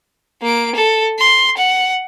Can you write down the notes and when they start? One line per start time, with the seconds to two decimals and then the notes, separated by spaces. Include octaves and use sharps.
0.42 A#3 D7
0.75 A4
1.19 C6
1.57 F#5